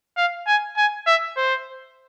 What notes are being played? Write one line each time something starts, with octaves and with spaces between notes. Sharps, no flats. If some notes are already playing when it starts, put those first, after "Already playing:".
F5
G#5
G#5
E5
C5